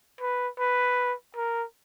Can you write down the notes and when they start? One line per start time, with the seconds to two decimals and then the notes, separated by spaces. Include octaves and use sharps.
0.21 B4
0.59 B4
1.37 A#4